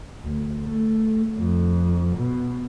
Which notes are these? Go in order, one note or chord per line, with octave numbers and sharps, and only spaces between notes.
D2
A3
F2
B2